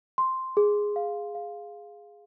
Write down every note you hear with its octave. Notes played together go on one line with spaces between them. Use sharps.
C6
G#4
F5
F5